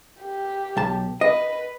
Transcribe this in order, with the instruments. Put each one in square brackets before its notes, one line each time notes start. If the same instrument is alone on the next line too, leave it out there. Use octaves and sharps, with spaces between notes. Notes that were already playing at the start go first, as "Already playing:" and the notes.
[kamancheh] G4
[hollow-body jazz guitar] B1 A5
[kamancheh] B4 [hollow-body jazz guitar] D#5